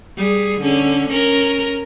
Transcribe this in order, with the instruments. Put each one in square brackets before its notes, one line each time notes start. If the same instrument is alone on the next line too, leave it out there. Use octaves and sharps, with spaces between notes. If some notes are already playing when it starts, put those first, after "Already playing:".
[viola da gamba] G3 G#4
D3 C#4
C#4 A#4